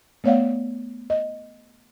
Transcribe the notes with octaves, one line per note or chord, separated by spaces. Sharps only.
A3 B3 C#5 D5 F5 F#5
D#5